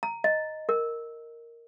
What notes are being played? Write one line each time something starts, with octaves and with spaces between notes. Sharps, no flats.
A#5
D#5
A#4